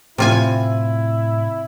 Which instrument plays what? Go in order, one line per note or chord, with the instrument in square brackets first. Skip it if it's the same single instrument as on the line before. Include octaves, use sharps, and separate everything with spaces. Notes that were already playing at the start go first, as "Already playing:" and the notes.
[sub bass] A2 [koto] C3 F4 G#5 [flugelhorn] E4